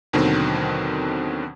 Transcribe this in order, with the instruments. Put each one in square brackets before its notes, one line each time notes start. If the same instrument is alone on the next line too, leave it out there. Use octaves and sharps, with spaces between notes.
[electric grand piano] D#2 B2 D3 D#3 F#3 C4